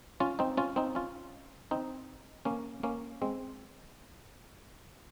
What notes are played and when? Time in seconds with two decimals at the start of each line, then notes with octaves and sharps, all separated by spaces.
0.20 C#4 F4
0.39 C4 D#4
0.57 C#4 F4
0.76 C4 D#4
0.95 C#4 F4
1.71 C4 D#4
2.45 A#3 C#4
2.83 A#3 C#4
3.22 G#3 C4